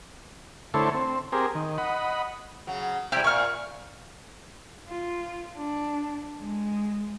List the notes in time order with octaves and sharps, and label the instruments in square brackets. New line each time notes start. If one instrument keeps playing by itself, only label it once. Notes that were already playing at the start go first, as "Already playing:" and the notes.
[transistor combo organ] D3 A3 E4 A4 C5 C#5
C4
C4 G4 G#4 A#4
D#3
D#5 F#5 B5
[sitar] C#3 F#3
[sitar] C3 G3 [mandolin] E4 G4
[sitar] A#2 [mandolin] C#6 F6
[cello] F4
D4
G#3